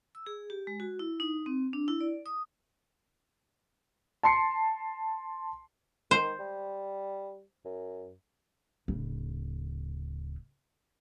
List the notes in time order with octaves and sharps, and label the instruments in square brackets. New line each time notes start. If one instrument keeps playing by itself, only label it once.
[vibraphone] E6
G#4
G4
G#3
F#4
E4
D#4
C4
D4
E4
D5
D#6
[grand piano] A5 C6 C7 C#7
[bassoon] D#3 [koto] C5
[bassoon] G3
F#2
[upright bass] D1 C#3